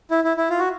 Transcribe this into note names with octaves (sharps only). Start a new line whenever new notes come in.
E4
E4
E4
F4
F#4